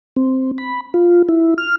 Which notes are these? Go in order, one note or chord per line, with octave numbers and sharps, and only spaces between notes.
C4
B5
F4
E4
F6